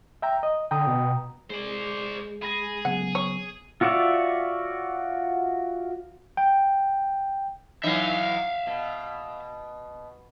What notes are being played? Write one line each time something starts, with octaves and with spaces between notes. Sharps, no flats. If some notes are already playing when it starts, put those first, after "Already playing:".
E5 G5 A#5
D#5
D3 G5 A#5 D#6
B2
G#3 C5 D5
G#4 B5 A#6
C#3 F#3 B3 F#5
C#5
F4 F#4 C#5 D5 E5
G5
E3 F#3 D#4 E5 F5
B2